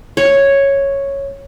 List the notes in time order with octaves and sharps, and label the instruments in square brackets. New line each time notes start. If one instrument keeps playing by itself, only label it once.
[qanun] C#5